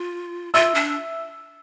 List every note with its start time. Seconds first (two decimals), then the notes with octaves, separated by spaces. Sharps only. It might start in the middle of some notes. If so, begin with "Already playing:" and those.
Already playing: F4
0.54 F4 E5 E6
0.75 D4